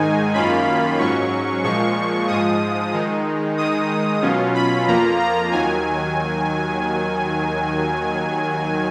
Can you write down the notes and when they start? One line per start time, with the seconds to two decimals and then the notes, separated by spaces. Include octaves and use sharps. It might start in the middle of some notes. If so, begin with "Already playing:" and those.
Already playing: G#2 D#3 G#3 D#4 G#5
0.34 F#2 D#3 A#3 C#4 F4 B5
0.99 G#2 F#3 C#4 C#6
1.63 A#2 F3 G#3 C#6
2.28 G#2 F3 G#3 D#6
2.93 D#3 G#3 D#4
3.57 D#3 G#3 D#4 D#6
4.22 B2 F#3 C#4 F4
4.55 B5
4.87 F2 F3 A#3 F4 A#5
5.19 A#5
5.51 D#2 D#3 F#3 G#5